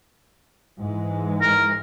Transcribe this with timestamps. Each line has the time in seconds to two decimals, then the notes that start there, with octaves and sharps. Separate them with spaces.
0.80 G#2 E3 G#3
1.42 A#4